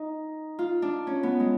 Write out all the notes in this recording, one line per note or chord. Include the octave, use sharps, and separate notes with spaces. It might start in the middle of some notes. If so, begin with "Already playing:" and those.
Already playing: D#4
F4
D4
C#4
B3
G#3